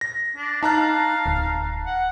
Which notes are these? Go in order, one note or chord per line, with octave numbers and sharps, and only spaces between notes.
A#6
D4
D#4 F5 A5 A#5 F#6
D1
F#5